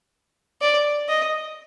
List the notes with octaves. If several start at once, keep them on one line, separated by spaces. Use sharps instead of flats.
D5
D#5